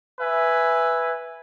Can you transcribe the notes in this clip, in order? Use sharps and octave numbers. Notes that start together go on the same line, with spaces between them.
B4 E5 G#5